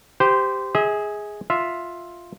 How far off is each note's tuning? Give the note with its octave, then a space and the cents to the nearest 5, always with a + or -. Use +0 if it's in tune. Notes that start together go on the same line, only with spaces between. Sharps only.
G4 +0 C5 -20
G#4 +0 E5 -45
F4 +0 E5 +0